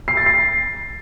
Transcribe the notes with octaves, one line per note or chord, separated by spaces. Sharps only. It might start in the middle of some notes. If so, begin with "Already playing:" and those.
C7
A6
C7